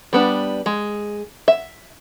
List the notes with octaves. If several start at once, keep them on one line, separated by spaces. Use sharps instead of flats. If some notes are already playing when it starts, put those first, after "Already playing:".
G3 B3 D4
G#3
E5